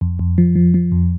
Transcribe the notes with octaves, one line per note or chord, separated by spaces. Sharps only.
F2
F2
F3
F3
F3
F2